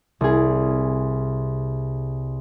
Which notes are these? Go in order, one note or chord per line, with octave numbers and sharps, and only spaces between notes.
C2 G#4